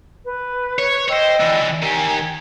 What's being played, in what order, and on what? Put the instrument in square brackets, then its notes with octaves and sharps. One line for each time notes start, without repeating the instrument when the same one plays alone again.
[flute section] B4
[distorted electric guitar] C#5
[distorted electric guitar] C5 C#5 [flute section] D#5 G5 E6
[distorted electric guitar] E3 D4
[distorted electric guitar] D#3 G4 [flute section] G#5